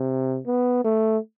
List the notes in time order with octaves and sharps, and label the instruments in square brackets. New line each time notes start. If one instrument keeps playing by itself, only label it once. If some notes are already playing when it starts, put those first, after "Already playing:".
Already playing: [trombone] C3
B3
A3